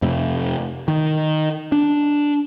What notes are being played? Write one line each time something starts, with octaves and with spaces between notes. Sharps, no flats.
F2 C3 A3
D#3
D4